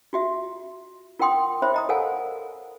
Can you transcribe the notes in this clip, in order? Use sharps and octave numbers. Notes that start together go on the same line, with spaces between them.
F4 F#4 E5
F4 A#4 F#5 G5 C6 D#6
C5 C#5 E5 B5
D#5 A#5 D#6
A4 A#4 C#5 F5 F#5 G#5